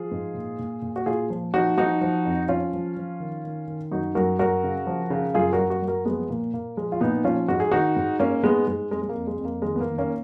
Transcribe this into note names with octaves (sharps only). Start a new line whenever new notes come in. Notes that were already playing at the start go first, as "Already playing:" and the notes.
Already playing: F3 F4 G#4
G#2
A#2
A#2
A#2
F#4
A#2 F4 G#4
F3
F3 D#4 F#4
F3 D#4 F#4
F3
F2
F3 C#4 F4
F3
F3
D#3
D#3
D#3
F#2 D#4 F#4
F#2 F#4 A#4
F#2 F#4 A#4
C#3
F3
C#3
F#2 F4 G#4
F#4 A#4
F#2
F#4 A#4
F#2
F#4 A#4
F3 G#3 B3
A#2 A#3
A#2 A#3
F3 G#3
F4
A#2 B3 D#4
F3 C#4 F4
G#2 F#4
G#4
D#3 D#4 F#4
G#2
G#2 A#3 C#4
G#2 G#3 B3
G#2 G#3
F2 G#3
G#3
A#3
F2
G#3
F2
A#3
D#3 G#3
B3
A#3
D#3
A#3 C#4